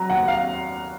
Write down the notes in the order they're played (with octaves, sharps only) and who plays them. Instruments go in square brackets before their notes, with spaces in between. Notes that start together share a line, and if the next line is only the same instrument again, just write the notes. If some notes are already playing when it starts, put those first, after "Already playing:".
Already playing: [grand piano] F#3 A#5
D#2 F#5
F5